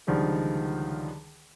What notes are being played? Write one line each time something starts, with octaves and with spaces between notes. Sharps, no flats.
C#2 D3 D#3 F3 G3 G#3